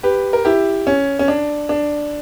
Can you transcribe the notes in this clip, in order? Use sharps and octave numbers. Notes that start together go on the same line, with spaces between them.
G4 B4
A#4
E4 G4
C#4
C#4
D4
D4